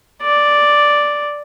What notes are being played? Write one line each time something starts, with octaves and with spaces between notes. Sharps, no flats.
D5